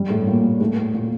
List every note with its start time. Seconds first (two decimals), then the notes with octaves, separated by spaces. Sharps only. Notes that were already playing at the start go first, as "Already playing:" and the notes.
Already playing: G2 G3
0.10 A2 A3
0.27 A#2 A#3
0.61 A2 A3
0.94 A#2 A#3